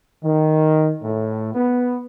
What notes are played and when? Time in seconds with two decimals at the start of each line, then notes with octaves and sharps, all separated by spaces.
0.24 D#3
1.03 A2
1.55 B3